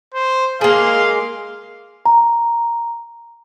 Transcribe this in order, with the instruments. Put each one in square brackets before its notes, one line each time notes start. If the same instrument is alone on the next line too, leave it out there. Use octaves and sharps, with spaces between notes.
[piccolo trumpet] C5
[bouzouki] G#3 A#3 [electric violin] G#4 C6 [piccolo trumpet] F5
[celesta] A#5